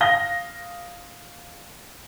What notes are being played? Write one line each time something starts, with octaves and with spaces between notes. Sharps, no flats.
F5 D#6 A#6 G7